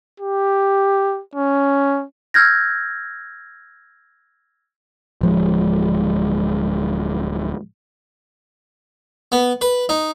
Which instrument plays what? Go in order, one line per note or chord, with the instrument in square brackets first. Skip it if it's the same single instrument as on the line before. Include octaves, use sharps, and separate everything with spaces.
[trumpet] G4
C#4
[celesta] E6 F6 G6 G#6 A#6
[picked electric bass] D1 F3 G#3
[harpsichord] B3
B4
D#4